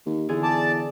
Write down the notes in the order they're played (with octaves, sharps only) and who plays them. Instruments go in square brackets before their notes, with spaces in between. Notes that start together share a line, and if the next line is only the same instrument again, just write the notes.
[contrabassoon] D#2
[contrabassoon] E2 [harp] D3 G#4
[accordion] D5 A5